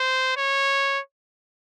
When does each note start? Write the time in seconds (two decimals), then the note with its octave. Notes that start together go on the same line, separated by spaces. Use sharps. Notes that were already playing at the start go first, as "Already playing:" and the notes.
Already playing: C5
0.37 C#5